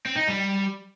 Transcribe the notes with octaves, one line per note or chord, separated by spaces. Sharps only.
C4
D#4
G3